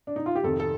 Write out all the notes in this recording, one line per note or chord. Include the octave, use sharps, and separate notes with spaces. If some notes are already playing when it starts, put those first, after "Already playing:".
D4
D#4
F4
G4
F2 C3 D#3 A4
A4